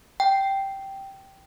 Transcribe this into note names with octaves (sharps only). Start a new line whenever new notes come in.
G5